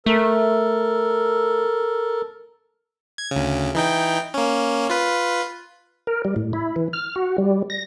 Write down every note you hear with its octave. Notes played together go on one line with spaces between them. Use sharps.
A3 A4 A#4
G#6
D2 C#3
E3 D#4 G5
A#3 C#4
F4 B4
A#4
G3
A2
E4
E3
F6
F#4
G3
A#6